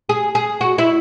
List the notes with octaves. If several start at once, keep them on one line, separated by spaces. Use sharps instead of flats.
G#4
G#4
F#4
E4